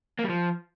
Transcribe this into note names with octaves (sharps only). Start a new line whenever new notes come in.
A#3
G3
F3